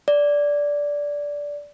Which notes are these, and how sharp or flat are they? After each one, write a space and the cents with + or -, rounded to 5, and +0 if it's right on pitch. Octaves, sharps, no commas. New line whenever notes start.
D5 -10